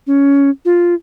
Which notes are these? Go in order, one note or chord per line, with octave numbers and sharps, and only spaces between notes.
C#4
F4